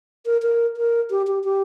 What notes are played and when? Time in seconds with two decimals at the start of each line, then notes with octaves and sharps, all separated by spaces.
0.26 A#4
0.42 A#4
0.77 A#4
1.11 G4
1.27 G4
1.44 G4